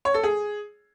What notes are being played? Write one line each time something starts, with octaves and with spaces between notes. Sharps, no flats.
C#5
A4
G#4